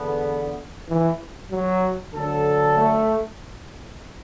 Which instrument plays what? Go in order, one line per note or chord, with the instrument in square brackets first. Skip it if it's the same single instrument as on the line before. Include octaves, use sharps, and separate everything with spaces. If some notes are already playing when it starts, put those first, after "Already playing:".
Already playing: [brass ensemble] E2 D3 B3
[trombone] E3
F#3
[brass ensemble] D2 D3 F#3 D4 A4
[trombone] A3